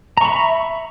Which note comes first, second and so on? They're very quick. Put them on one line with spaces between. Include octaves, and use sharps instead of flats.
A#5 C#6 B5 E5